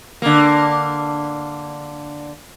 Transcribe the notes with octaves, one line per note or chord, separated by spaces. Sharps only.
D3 A#3